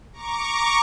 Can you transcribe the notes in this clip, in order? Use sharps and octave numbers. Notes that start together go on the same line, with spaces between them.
A#5 C#6 D6